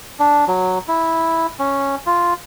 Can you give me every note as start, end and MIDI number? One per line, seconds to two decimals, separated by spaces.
0.19 0.45 62
0.48 0.79 54
0.88 1.47 64
1.59 1.95 61
2.06 2.34 65